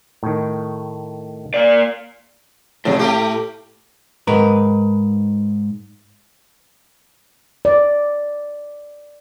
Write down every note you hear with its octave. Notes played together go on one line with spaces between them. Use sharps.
A2 D#3
A#3 D5
F2 A2 C3 F#3
A3 A#3 G4
G#2 A#4 B4
D5